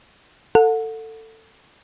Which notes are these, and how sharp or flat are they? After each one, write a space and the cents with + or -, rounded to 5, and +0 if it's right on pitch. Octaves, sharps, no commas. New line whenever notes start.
A4 +20 F#5 -30